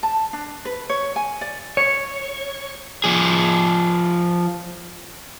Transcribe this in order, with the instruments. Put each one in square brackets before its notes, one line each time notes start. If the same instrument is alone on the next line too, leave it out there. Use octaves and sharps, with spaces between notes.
[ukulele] A5
D4
B4
C#5
G#5
D5
[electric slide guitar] C#5
[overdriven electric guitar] F3 G#4